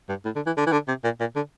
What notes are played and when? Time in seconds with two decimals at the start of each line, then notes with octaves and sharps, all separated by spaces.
0.09 G2
0.25 A2
0.35 D3
0.46 E3
0.57 D3
0.66 E3
0.72 D3
0.88 C3
1.04 A#2
1.20 A#2
1.36 D3